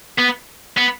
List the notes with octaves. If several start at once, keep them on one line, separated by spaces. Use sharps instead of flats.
B3
B3